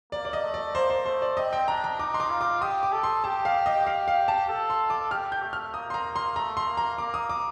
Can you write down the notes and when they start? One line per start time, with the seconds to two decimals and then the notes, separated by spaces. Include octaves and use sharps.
0.12 A#3 D5
0.25 D5
0.33 D#5
0.43 A3
0.54 D5
0.74 A#3 C5
0.90 C5
1.05 A3 C5
1.22 D5
1.37 C4 D#5
1.53 G5
1.68 D4 A#5
1.84 A#5
1.99 D#4 D6
2.14 C6
2.20 D6
2.30 F4
2.41 D6
2.62 G4 D#6
2.83 D6
2.93 A4
3.03 C6
3.24 G4 A5
3.45 F5
3.66 D#5
3.86 G4 F5
4.08 F5
4.28 A5
4.49 A4
4.70 C6
4.90 D6
5.11 G4 F6
5.32 G6
5.43 A3
5.53 F6
5.74 A#3 D#6
5.90 C6
5.94 A#5
6.16 C6
6.36 A3 A#5
6.57 C6
6.67 A#3
6.77 A#5
6.98 A#3 D6
7.14 D#6
7.29 D6